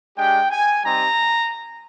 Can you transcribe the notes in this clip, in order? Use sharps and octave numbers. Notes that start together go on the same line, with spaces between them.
G#3 D4 G4 G5
G#5
G3 C4 D#4 G4 A#5